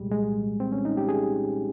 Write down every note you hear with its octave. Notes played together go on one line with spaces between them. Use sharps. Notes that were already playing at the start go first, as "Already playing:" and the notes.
Already playing: C2 A#2 G3 G#3
G#3
C4
C#4
D#4
G4
G#4